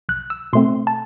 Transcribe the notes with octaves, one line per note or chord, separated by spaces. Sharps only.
B1 F#6
E6
B2 A3 C4 C6
A5